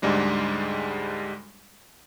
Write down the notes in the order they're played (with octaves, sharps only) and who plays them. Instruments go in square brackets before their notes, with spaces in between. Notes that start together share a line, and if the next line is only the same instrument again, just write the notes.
[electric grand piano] D2 G#2 G3 G#3 D4